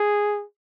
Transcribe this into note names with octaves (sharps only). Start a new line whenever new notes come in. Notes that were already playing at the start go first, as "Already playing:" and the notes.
Already playing: G#4